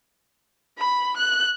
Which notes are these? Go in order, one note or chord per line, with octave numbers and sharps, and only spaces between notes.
B5
F#6